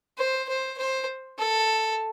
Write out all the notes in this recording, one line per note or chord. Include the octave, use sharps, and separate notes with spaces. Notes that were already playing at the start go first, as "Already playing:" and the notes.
C5
C5
C5
A4